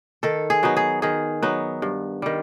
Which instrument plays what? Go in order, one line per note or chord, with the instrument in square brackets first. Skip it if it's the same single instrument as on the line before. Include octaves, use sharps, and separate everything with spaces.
[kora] D#3 A4
G#4
F#3 B3 D#4
G#4
D#3 G#4
F#3 B3 D#4
G2
D#3 G3